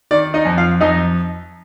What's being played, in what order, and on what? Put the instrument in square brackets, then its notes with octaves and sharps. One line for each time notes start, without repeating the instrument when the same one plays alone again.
[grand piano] D#3 D5
D#4 D#5
F2
F4 F5
F2 D#4 D#5